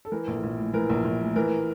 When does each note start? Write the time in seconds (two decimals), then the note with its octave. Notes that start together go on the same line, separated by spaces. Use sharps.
0.05 A4
0.12 E3 A#4
0.27 A#1
0.43 A#1
0.58 A2
0.73 E3 A#4
0.89 A#1
1.04 A#1
1.21 A2
1.36 E3 A#4